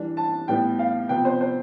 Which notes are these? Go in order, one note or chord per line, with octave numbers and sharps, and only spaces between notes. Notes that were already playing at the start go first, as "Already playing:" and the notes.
Already playing: E3 G3 D4
A5
A2 G3 B3 G5
F5
C3 F3 B3 G5
C5
C5